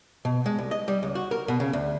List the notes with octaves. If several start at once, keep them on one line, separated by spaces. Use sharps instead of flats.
B2
G#3
C2
D#5
G3
C#2
F#4
A#4
B2
C#3
D2